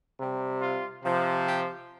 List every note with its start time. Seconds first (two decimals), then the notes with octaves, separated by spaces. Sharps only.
0.18 C3 G3
0.61 F4
1.04 C3 F3
1.45 G4